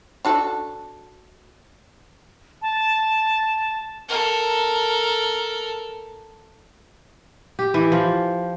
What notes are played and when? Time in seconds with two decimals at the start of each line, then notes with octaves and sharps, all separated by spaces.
0.25 D4 F#4 A4
2.62 A5
4.08 A4 A#4
7.59 G4
7.74 E3
7.92 F3